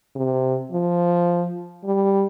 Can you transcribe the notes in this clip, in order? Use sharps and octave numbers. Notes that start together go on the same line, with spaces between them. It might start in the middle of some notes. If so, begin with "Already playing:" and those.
C3
F3
G3